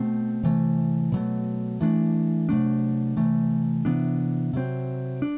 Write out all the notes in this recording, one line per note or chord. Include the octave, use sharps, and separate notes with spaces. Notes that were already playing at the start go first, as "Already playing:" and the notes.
Already playing: B2 A3 C4
C3 E3 A3
B2 F#3 A3
E3 A3 D4
C3 F#3 A3 D4
C3 E3 A3
C3 E3 B3 D4
C3 F#3 C4
D4